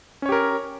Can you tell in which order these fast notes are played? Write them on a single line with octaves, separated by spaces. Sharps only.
C#4 C#5 G4 A#4